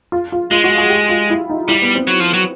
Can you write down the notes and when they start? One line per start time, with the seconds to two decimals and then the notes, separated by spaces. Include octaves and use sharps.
0.12 F4
0.32 F4
0.51 G#3 F4
0.64 F#4
0.78 G#4
0.90 G4
1.09 F4
1.30 E4
1.50 D#4
1.69 G3 E4
1.82 B3
1.95 C4
2.07 F#3
2.20 F3
2.33 F#3